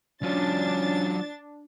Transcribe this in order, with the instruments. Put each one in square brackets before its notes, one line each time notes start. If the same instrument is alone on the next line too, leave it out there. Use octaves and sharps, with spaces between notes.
[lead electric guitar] F#3 F4 [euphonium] C#4 [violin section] D4 A6